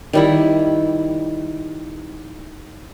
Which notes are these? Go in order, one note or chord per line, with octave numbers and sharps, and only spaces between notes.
D#3 G3 E4